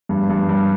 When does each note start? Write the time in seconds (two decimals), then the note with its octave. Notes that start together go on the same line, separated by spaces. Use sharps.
0.09 G2
0.29 G2
0.49 G2